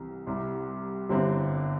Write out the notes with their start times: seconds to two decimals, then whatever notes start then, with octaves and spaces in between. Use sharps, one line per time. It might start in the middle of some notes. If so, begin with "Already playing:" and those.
Already playing: C2 C3 E3
0.27 C2 C3 G3 E4
1.09 G1 G2 D3 C4 E4